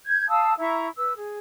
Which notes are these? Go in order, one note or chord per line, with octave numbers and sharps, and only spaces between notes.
G6 G#6
F5 A5 D#6 E6
E4 E5 A#5 C#6
B4 E6
G#4